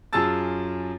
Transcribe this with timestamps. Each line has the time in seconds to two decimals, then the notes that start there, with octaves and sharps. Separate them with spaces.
0.13 F#2 F4 G#4 A5 E6 A6